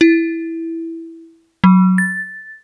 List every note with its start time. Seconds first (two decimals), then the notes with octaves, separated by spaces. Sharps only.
0.01 E4
1.64 F#3
1.98 A6